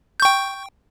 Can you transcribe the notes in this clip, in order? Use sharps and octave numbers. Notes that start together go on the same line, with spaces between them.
G5 C#6 G6